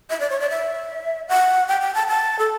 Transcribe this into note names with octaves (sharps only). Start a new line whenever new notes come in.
E5
D5
C#5
D5
E5
F#5
G5
G5
A5
A5
A4